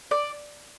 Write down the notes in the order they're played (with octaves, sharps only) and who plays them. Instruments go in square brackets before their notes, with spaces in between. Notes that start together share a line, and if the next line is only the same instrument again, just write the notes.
[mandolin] D5